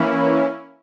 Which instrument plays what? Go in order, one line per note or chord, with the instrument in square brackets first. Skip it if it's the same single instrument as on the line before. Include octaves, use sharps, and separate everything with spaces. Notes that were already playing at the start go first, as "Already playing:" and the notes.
Already playing: [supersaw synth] E3 A#3 C#4 E4